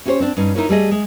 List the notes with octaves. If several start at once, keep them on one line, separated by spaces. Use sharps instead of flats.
C#4 E4 G4 G#4 C5 C#5
C4 D4
G2 C#4 D#4
D#4 E4 A#4 B4 C#5
G3 A3 G#4 D#5
G#3